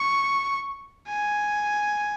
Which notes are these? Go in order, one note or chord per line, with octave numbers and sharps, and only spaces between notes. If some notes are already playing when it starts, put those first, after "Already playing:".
Already playing: C#6
G#5